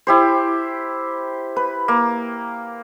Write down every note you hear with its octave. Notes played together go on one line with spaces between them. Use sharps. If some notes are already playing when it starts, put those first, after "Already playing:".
E4 G4 C5
B4
A#3